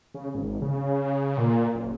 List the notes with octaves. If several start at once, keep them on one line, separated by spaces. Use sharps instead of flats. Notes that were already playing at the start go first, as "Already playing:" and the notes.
C#3
G#1
C#3
A#2
F#1